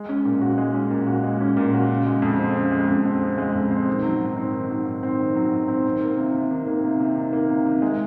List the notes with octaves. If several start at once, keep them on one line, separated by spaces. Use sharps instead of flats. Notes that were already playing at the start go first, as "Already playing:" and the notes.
Already playing: G#3
C#4
A#2
F#4
G#3
C#4
A#2
F#4
G#3
C#4
A#2
F#4
C#3
G#3
F2
C4
C#3
G#3
F2
C4
C#3
G#3
F2
C4
D#3
F#3
G#2
C4
D#3
F#3
G#2
C4
D#3
F#3
G#2
C4
D#3
A#3
C3
C3
D#3
A#3
C3
C3
D#3
A#3
C3
C3
G#3